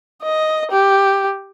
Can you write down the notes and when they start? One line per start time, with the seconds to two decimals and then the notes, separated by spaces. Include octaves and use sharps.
0.22 D#5
0.71 G4